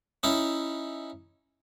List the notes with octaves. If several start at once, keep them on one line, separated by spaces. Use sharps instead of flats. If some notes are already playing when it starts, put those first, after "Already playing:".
C#4 D#4 E4